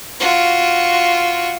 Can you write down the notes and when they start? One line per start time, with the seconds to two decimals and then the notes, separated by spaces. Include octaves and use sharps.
0.20 F4 F#4